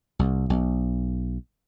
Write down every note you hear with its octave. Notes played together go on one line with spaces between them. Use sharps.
C2
B1